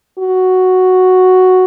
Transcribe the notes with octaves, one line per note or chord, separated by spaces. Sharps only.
F#4